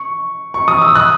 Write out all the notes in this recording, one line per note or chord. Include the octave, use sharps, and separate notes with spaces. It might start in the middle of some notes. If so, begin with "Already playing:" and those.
Already playing: C#6
C#6
D#6
E6
D#6 F#6